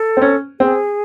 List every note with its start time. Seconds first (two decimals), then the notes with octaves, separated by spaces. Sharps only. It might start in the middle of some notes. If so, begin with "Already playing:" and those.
Already playing: A4
0.17 C4
0.22 C#4
0.60 C4 G#4